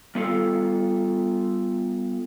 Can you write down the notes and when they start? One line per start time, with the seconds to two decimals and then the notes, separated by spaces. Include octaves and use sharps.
0.15 G3 B3 F4 A4